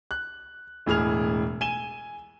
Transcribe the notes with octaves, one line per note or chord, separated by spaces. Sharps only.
F#6
E1 A2 G#4 F6 F7
G#5 D#7 E7 G7